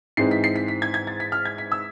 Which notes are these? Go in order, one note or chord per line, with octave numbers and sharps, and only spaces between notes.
G#2 E3 G#3 C4 C7
B6
C7
B6
B6
G#6
G#6
A6
B6
F6
G#6
B6
E6